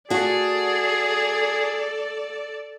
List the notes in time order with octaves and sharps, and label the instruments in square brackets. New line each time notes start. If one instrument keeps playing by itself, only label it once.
[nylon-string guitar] A3 F#4 [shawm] G#4 [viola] A4 D5